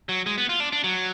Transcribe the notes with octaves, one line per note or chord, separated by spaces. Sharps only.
F#3
G#3
B3
F4
D4
D4
F#3